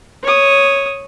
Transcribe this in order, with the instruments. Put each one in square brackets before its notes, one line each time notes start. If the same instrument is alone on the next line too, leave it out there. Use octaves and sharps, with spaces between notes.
[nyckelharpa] C#5 D#6